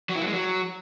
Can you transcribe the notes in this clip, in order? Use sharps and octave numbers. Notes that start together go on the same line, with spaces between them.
F#3
E4
F#3
G#3
F#3